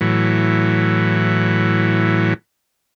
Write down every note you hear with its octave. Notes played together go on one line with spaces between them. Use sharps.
A2 E3 F#3